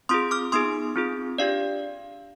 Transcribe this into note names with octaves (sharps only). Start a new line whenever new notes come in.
C4 F4 G#4 C6 D#6
D6 F6
B3 D#4 G#4 C6 D#6
C4 F4 G#4
D4 G4 D5 F5